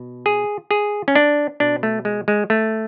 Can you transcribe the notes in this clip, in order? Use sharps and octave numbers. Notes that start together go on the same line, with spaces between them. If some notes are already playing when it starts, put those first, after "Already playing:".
Already playing: B2
G#4
G#4
C#4
D4
B2 D4
A3
G#3
G#3
A3